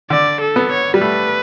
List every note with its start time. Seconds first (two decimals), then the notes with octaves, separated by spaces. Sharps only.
0.10 D3 D5
0.41 A4
0.56 B3
0.71 C#5
0.94 G3
1.01 A3 B4